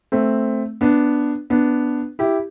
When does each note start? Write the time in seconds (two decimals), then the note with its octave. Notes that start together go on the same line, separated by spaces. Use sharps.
0.12 A3 C4
0.81 B3 D4
1.50 B3 D4
2.19 E4 G4